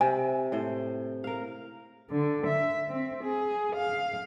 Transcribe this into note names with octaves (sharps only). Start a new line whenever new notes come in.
C3 G#5
A2 C5
A#4 F5
D3
E5
C4
G#4
F5